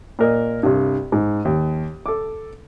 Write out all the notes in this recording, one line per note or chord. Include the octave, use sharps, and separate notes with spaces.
A#2 A#4 D#5
C2 G2
G#2
D#2
A4 D6